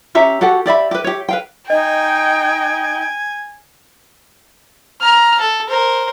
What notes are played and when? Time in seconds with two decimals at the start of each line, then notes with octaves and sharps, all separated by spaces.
0.15 C#4 G4 E5 A#5
0.41 F#4 G4 A4 F#5
0.66 G4 D5 E5 B5
0.91 G4 B4
1.04 G4 C#5
1.29 B4 F5 G5
1.70 D#4 D#5 G5 G#5
5.01 A#5 F6
5.40 A4
5.69 A#4 C5